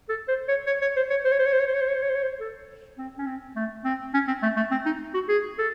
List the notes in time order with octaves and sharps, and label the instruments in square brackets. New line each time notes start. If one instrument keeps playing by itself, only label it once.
[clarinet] A4
C5
C#5
C#5
C#5
C5
C#5
C5
C#5
C5
C#5
C5
C#5
C5
C#5
C5
C#5
C5
C#5
C5
C#5
C5
A4
C4
C#4
C4
A3
C4
C#4
C4
A3
A3
C4
D#4
F#4
G#4
A4